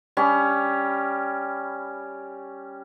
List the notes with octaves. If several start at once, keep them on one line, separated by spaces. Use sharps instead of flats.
G3 C#4